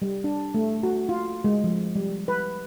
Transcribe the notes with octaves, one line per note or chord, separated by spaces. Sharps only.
G3
D4
A3
F#4
F4
G#3
F3
G3
B4